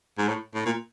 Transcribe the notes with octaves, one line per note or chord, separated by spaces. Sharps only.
G#2
A2
A2
A#2